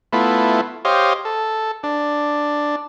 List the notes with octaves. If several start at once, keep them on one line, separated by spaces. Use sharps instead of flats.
A3 B3 E4 F4
G4 C5 C#5 D#5 F5
A4
D4